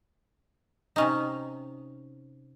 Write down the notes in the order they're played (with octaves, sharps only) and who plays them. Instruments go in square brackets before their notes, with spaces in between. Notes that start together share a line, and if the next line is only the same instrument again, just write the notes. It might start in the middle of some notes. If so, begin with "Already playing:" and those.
[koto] C3 C#4 D#4